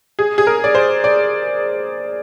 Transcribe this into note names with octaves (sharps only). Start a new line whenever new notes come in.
G#4
G#4
A#4
D5
C5
D5